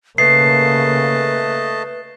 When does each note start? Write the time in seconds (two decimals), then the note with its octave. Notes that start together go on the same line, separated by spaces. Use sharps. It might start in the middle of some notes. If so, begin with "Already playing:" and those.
0.18 C#3 A3 A#3 B4 D#5 A5 C7